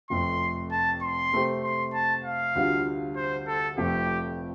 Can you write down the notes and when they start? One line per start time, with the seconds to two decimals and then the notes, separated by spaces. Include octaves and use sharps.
0.10 F1 F2 F3 A3 C6
0.72 A5
1.02 C6
1.32 C3 A3 C4 G4
1.63 C6
1.94 A5
2.24 F5
2.55 D2 D3 G3 F4
3.16 C5
3.47 A4
3.78 F1 F2 F3 A3 G4